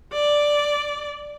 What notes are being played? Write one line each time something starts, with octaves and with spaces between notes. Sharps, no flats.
D5